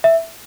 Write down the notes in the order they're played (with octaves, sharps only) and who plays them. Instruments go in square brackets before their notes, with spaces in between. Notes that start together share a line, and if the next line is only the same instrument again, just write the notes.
[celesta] E5